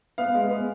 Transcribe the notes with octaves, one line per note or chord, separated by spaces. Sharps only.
B3 F5
G#3
B3